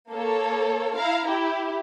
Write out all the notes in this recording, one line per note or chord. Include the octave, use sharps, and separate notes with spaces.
A#3 A4 C#5
E4 F5 A#5
E4 G4